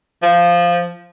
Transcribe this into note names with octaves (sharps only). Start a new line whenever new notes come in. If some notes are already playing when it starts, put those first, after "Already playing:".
F3